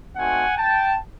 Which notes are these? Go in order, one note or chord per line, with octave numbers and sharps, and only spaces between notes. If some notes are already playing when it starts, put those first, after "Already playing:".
A3 C4 D#4 F#4 F#5 G#5
G5 A5